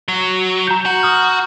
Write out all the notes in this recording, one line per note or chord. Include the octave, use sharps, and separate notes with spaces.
F#3
A#5 G6
F#4
D#6 F6